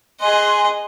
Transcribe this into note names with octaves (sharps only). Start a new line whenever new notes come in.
G#4 D#5 G#5 C6 F#6